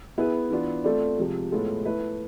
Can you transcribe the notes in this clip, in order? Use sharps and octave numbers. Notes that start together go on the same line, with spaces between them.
B3 E4 G#4 B4
E3 B3 D4 F4
A3 C4 F4 A4 D5
C3 F3 G#3
A2 G#3 B3 F4 A4
A3 E4 B4